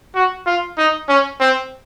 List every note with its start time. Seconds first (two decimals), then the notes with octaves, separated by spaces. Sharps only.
0.15 F#4
0.46 F4
0.78 D#4
1.08 C#4
1.40 C4